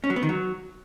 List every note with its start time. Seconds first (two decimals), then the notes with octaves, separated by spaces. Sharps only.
0.04 C#4
0.10 F#3
0.16 B3
0.23 D#3
0.29 F#3